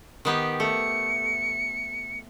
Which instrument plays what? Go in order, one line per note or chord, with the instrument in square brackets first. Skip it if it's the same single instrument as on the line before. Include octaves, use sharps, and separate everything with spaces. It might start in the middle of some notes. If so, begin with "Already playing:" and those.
[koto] D#3 B3 G4
[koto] A3 [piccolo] C#7